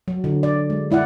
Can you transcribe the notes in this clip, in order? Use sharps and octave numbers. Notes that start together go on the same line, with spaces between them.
F#3
D3
D5
G#3
G#3 E4 D5 F#5